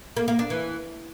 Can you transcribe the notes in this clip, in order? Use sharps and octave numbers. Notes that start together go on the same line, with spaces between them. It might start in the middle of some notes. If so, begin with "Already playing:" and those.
A#3
A#3
D4
E3